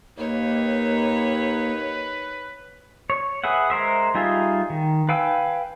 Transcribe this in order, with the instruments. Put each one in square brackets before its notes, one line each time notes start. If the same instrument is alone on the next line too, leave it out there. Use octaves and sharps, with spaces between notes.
[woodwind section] D#2 D#4 [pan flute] A#3 [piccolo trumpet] B4 [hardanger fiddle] C#5
[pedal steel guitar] C#5
G#4 B4 E5 F#5
G#3 A#4 C5 E5
G3 D#4 F4 G#4 E5
D#3
B4 F5 G5 G#5 E6